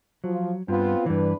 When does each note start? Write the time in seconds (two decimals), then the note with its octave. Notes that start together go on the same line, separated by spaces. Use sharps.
0.24 F3 F#3
0.68 G2 B3 C4 F4
1.06 E2 G2 E3 D4 B4